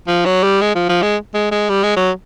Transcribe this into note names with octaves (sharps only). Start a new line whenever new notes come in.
F3
F#3
G3
G#3
F3
F3
G#3
G#3
G#3
G3
G#3
F#3